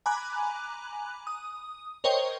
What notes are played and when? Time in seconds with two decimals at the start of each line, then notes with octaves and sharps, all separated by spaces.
0.06 G#5 A#5 B5 D6 F#6
1.27 D#6
2.04 A#4 C5 C#5 D#5 G5